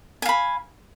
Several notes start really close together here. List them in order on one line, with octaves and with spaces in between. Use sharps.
G#5 F5 B5